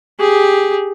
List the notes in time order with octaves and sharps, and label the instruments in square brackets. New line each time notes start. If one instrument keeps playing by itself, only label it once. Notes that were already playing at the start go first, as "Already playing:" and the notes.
[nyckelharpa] G4 G#4